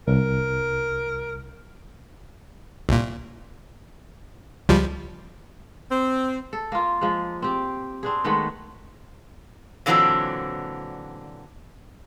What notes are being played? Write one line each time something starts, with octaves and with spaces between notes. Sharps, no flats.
C2 A#4
C2 A#2
C#2 F3 G3
C4
A4
A#3 F4
F3 G#3
C4 G4
C4 D4 G#4
D#3 G#3 A3 B3
A#2 D3 E3 F#3 C4 D4